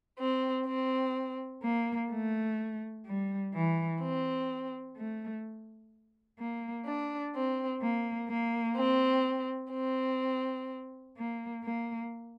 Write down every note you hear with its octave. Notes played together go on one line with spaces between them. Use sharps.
C4
C4
A#3
A3
G3
E3
C4
A3
A#3
D4
C4
A#3
A#3
C4
C4
A#3
A#3